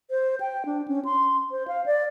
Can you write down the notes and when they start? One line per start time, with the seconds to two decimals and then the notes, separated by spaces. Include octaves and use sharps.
0.11 C5
0.40 G5
0.66 D4
0.88 C#4
1.05 C6
1.51 C5
1.68 F5
1.86 D5